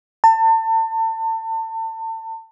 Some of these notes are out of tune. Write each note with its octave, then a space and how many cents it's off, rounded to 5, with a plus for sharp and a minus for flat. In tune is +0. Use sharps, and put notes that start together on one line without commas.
A5 +35